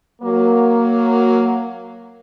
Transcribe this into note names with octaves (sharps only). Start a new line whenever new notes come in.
F#3 A#3